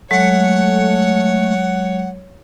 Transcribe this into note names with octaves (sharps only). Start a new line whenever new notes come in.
F#3 G#3 A3 C#5 F#5